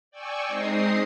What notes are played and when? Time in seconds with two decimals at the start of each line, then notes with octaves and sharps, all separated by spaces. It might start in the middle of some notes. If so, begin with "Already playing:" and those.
0.11 D5 G5 G#5 C#6 E6
0.47 G#3 C4 D#4 D#5 D#6 C7